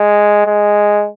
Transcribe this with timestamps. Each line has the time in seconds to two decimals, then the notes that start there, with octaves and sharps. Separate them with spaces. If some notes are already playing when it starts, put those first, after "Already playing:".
Already playing: G#3
0.46 G#3